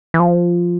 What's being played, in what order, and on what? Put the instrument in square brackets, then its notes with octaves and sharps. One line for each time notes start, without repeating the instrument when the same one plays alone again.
[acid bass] E3
F3